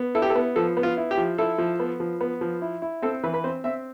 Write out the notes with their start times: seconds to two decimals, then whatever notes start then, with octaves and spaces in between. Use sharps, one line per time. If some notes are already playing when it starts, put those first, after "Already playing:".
Already playing: B3
0.15 E4 A4
0.22 G4
0.30 A4
0.35 B3
0.56 F3 A4
0.77 B3
0.83 F4
0.97 E4
1.11 G4
1.18 F3
1.38 E4 A4
1.58 F3
1.79 B3
2.00 F3
2.21 B3
2.41 F3
2.62 E4
2.82 E4
3.02 C4 A4
3.23 E3 B4
3.34 B4
3.44 C4 C5
3.64 C4 E5